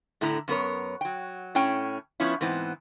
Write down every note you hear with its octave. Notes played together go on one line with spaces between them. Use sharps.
A2 D3 A3 E4 A#5
F#2 B3 A#4 C#5
F#3 G5
A2 A3 C#4 G5
F3 B3 C#4 E4
G#2 E3 B3 C4